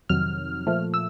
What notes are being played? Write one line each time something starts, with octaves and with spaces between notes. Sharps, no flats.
F2 C3 D#3 F#3 F6
A#2 F3 A3
E6